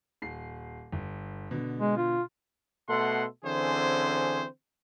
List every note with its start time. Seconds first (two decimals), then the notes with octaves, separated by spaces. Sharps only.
0.22 D#1 C7
0.92 G1
1.51 B2 D3
1.78 G#3
1.97 F4
2.89 B2 A3 A4 F#5 C6
3.44 D3 E3 C4 C#4 G#4 C5